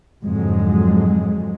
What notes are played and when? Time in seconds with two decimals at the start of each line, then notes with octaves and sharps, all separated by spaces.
0.24 F2 G#2 D3 F#3 G#3